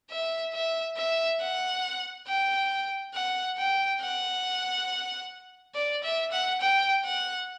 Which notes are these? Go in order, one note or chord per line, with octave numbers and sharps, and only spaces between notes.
E5
E5
E5
F#5
G5
F#5
G5
F#5
D5
E5
F#5
G5
F#5